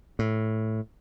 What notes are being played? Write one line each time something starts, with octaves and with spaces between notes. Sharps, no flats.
A2